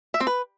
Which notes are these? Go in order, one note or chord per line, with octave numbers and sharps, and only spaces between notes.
E5
C4
B4